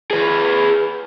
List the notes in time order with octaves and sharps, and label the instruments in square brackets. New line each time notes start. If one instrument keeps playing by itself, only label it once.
[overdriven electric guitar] G#4 B4